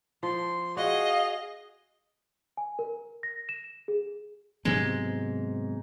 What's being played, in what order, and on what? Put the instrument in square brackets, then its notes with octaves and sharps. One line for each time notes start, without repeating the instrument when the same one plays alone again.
[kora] F3 [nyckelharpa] C6
[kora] F#4 [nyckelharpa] G#4 [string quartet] D#5 [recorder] F5
[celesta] G#5
A#4
A#6
E7
G#4
[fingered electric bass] G#2 [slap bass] C3 F#3 B3 [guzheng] G#3